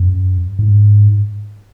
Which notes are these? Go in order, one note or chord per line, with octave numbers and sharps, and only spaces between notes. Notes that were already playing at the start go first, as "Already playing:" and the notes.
Already playing: F#2
G#2